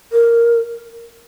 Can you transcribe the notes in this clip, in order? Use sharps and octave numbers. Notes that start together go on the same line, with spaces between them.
A#4